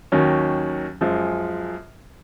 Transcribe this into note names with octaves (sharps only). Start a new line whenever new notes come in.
D#2 D#3 F#3 C#4
F#2 F3 G#3